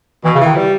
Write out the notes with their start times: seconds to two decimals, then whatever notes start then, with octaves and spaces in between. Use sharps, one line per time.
0.24 B2 E3
0.35 C#3
0.40 E3
0.46 D#3
0.56 G3